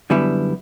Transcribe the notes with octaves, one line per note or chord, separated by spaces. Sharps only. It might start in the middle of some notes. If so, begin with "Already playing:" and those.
F#2 D3 G3 B3 E4